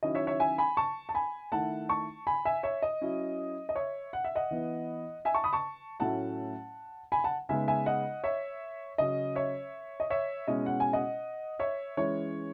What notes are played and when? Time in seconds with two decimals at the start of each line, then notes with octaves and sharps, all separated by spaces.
0.03 D#3 F#3 C#4 E4 D#5
0.15 C#5 E5
0.27 C#5 E5
0.40 E5 G#5
0.58 G#5 B5
0.77 A5 C#6
1.09 A5
1.15 G#5 B5
1.52 D#3 A3 E4 F#5 A5
1.89 A5 C#6
2.27 G#5 B5
2.45 E5 G#5
2.63 C#5 E5
2.82 D#5
3.01 F#3 C#4 E4
3.69 D#5
3.76 C#5 E5
4.13 F#5
4.24 E5
4.35 D#5 F#5
4.51 E3 B3 E4
5.25 E5 G#5
5.34 A5 C#6
5.44 B5 D#6
5.53 A5 C#6
6.00 A2 F#3 A3 C#4 E4 F#5 A5
7.12 G#5 B5
7.24 F#5 A5
7.49 C#3 G#3 B3 D#4 E5 G#5
7.68 E5 G#5
7.86 D#5 F#5
8.24 C#5 E5
8.98 C#3 F#3 C#4 D#5
9.35 C#5 E5
10.00 D#5
10.10 C#5 E5
10.47 B2 G#3 C#4 E4 D#5
10.66 F#5
10.80 G#5
10.93 D#5 F#5
11.59 C#5 E5
11.97 E3 G#3 C#4 E4 C#5